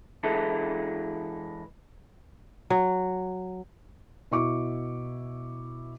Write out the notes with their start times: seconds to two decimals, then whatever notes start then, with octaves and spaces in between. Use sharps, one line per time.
0.23 E3 G#3 E4 A4
2.70 F#3
4.31 B2 E4 C#6 D6